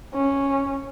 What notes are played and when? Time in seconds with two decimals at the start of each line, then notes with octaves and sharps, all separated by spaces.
0.14 C#4